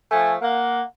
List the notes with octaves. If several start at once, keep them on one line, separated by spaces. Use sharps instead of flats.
F3 A3 G#5
A#3 F#5